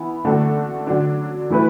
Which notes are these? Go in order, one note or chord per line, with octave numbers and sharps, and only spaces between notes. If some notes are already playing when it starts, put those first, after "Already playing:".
Already playing: E3 B3 E4
D3 A3 D4 F#4 A4
D3 F#3 D4
E3 A3 E4 B4